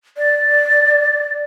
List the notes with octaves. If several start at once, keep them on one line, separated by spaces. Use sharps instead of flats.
D5